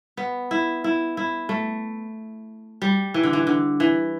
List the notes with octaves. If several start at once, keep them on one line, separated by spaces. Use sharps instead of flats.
B3
E4
E4
E4
A3
G3
E3
D3
E3
D3
E3